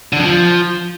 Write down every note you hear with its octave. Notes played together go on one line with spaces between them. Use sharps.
D3
F2
F3